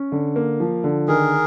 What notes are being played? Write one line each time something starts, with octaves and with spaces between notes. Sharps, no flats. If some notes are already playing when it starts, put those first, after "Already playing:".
Already playing: C#4
D3
A#3
F3
D3
D#3 G#4 A#4